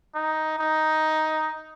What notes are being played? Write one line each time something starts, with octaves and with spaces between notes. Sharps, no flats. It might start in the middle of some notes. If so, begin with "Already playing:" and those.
D#4
D#4